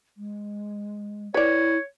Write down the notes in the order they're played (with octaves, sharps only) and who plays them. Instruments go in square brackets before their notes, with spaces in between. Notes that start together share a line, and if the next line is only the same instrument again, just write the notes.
[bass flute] G#3
[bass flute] E4 [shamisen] B4 D5 [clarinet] C#5